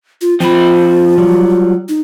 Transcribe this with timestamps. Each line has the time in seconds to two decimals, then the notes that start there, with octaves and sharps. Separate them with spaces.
0.21 F4
0.40 F3 C4 F4 B5
1.18 F#3 G3
1.89 D#4